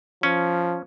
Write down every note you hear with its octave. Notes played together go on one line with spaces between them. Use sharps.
F3 C#4